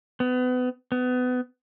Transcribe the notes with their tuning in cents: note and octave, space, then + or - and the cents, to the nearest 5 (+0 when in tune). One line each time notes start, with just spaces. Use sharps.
B3 +30
B3 +25